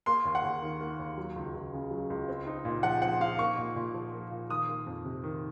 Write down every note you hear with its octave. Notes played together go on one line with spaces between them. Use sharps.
A#3 C6
D#2
F#5
D#2
D#3
A#3
D#2
F#3
C#2
C#2
C#3
F#3
C#2
C4
D#4
A#2
F3 F#5
C4 F#5
D#4 F5
A#3 C#6
A#2
A#2
F3
A#3
A#2
D#3 D#6
A#3
F2
C3
D#3